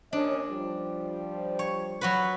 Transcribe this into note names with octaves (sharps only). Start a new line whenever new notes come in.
D#2 C#4 D4 D#5
F3 G3
C#5
F#3 F#4 B4